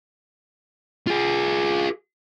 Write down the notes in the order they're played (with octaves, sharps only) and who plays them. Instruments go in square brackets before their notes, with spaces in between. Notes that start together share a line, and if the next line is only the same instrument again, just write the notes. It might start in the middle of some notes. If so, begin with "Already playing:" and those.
[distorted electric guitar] F4 G#4